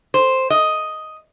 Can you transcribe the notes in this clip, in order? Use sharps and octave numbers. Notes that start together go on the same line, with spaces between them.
C5
D#5